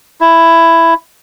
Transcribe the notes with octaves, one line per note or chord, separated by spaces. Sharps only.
E4